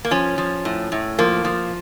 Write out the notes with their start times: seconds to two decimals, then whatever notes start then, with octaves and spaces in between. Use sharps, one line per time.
0.05 A#3
0.11 F3 C#4
0.38 F3
0.65 A2
0.92 A2
1.19 F3 A#3
1.45 F3